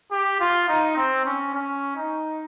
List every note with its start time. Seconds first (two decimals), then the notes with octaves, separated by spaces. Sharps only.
0.11 G4
0.40 F4
0.69 D#4
0.97 C4
1.25 C#4
1.54 C#4
1.97 D#4